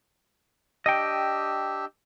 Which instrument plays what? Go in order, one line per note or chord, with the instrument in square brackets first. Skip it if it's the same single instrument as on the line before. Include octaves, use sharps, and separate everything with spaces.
[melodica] D4 G4 E6 [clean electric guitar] D#5 G5